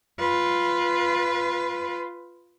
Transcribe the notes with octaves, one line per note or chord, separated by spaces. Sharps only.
F4 B4